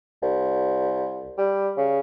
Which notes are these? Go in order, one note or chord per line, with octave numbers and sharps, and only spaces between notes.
C2
G3
C#3